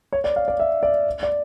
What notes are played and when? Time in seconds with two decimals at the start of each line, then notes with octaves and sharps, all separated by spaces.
0.13 C#5
0.24 D5
0.36 F5
0.48 D5
0.60 E5
0.83 D5
1.23 D5